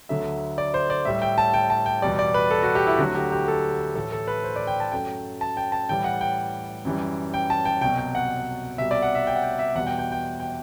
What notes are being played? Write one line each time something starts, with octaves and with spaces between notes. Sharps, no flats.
D2 D3 F#3 A3 E5
D5
C5
D5
A2 G3 E5
G5
A5
G5
A5
G5
E2 B2 G3 D5
D5
B4
A4
F#4
G4
E4
D2 D3 F#3 A3 F#4
G4
G4
A4
A2 E3 A3 A4
A4
B4
C5
D5
G5
A5
F#2 F#3 A3 G5
A5
G5
A5
A2 E3 G3 G5
F#5
G5
F#2 E3 G3
G5
A5
G5
C2 B2 F#3 G5
G5
F#5
C2 B2 G3 E5
D5
F#5
E5
G5
F#5
G5
E5
E2 B2 G3 F#5
G5
G5
G5
G5